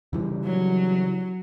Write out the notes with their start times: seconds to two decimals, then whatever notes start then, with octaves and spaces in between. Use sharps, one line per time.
0.13 C#3 E3 G3
0.44 F#3